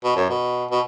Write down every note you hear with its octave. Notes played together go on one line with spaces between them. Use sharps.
B2
F#2
B2
B2